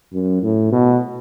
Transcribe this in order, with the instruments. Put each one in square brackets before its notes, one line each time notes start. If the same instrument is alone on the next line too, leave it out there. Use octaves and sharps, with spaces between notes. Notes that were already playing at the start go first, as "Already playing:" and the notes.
[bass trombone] F#2
A2
B2